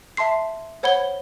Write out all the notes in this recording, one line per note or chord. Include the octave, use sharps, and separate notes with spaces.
E5 A5 C6 C7
C5 C#5 F#5 B5 G#6 G7